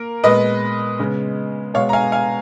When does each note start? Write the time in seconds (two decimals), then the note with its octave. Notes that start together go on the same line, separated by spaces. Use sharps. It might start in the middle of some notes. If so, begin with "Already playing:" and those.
Already playing: A#3 A#4
0.23 A#2 G#3 B3 B4 D#5
0.99 C#3 G#3 B3
1.74 B2 G#3 B3 C#5 F5
1.89 A#5
1.93 F5 G#5
2.12 F5 G#5